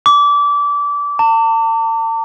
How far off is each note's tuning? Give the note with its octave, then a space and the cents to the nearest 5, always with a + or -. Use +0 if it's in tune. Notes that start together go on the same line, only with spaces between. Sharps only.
D6 -25
A5 +45